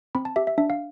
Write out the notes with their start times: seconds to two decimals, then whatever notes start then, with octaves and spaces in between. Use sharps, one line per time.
0.15 C4 B5
0.25 A5
0.36 G4 E5
0.47 E5
0.58 D4 E5
0.70 F5